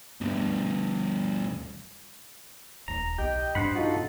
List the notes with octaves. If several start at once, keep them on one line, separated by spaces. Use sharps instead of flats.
D2 G2
D#1 D#2 A#5
B1 G4 D#5 G5
G2 D4 C5 F#5 B5
D#4 F4 F#4 A4